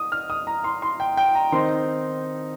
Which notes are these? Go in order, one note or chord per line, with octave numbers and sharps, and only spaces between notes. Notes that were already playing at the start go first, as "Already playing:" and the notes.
Already playing: D#6
F6
D#6
A#5
C6
C6
G5
G5
A#5
D#3 C4 D#4 C6